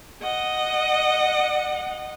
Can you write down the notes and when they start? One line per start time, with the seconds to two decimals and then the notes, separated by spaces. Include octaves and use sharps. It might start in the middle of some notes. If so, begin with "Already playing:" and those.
0.22 D#5 F#5